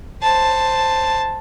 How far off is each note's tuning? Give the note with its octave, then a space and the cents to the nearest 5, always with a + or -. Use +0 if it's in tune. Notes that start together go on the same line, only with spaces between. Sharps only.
C5 +0 A5 +5